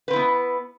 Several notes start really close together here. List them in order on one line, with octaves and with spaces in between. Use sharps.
B4 C4 E4 B3